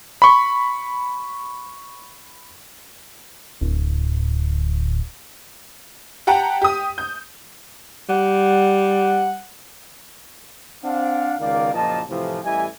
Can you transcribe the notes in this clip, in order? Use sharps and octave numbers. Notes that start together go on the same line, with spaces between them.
B5 C#6
D1
G4 F#5 G5 A5 A#5
G4 D#6
G6
G3 F#5
C4 D4 F5 F#5
C#2 D#3 D5 F5
F#1 A#2 F3 D#5 A5
A2 C3 E3 F3
A1 E3 G3 D#5 E5 G#5